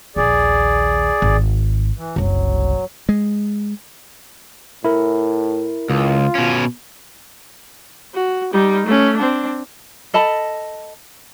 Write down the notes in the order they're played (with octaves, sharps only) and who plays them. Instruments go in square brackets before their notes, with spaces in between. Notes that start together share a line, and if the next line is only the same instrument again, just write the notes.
[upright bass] A#1 D#2 [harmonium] G#4 D5
[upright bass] G#1
[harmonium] E3
[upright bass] F#1 C2 [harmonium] F#3
[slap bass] G#3
[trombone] A2 [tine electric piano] E4 A#4
[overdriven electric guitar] C#2 [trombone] F4
[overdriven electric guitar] B2 C#4
[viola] F#4
G3 D#4
A3 C#4
C4 D4
[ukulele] A4 D#5 A5 B5